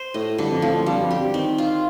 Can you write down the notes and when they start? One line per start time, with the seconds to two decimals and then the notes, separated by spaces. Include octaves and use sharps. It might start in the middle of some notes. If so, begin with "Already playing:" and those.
Already playing: C5
0.14 A2 D#5
0.38 G2 D3
0.50 F2
0.62 A2 F3
0.74 F2
0.86 G2 G3
1.02 F2
1.11 G4
1.18 G2
1.34 D#3 C4
1.58 F4